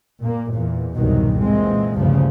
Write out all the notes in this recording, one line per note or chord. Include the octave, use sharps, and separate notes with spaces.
A#2 A#3
E2 A#2
C2 F2 G#2 B2 D#3 F#3
A#2 E3 G#3 C4
G1 D2 G2 A#2 C#3 F3